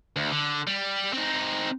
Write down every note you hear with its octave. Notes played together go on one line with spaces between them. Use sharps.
D2
D3
G3
C4 D#4